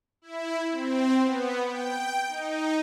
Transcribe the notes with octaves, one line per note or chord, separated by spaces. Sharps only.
E4
C4
B3
G5
D#4